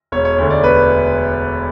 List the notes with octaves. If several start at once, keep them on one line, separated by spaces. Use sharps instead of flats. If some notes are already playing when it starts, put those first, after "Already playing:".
E1 C#5
C#5
D2 D3
D5
E1 B4